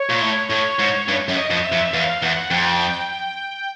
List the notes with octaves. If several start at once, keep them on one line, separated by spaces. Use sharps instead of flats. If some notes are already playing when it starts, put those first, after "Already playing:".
Already playing: C#5
A#2
A2
A2
G#2
G2
F#2
D#5
F2
E5
F2
E2 F5
E2 F#5
F2 G5
G5